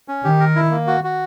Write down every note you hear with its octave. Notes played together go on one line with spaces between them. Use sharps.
C#4
D#3 G4
A#4
E4
A#3
F#4
F#4